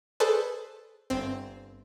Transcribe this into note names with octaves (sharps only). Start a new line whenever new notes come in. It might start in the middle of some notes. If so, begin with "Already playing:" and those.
G#4 A4 B4 C5 D5
G1 C4